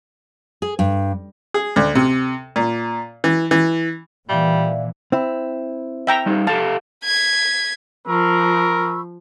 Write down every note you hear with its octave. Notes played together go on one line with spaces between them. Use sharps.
G#4
G2
G#4
D2
C3
A#2
E3
E3
A#2 E3 G3 D5 E5 F5
C4 E4
E5 G5 A#5
G3 D#4
G4 A4 F5 A5
G#6 B6
F3 A#4 B5 C#6 E6